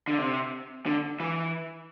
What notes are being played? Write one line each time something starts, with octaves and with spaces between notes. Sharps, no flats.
D3
C3
D3
E3